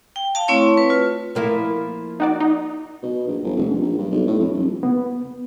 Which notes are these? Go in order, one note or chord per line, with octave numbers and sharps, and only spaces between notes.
G5
F5 A5
A3 C4 E4 C#5 C#6
B4
F4
F3 A#3 E4
D#4 F#4 D5
D#4
B2
A#1
G1
F1
A#1
A#1
G2
B1
A2
F2
D#1
B3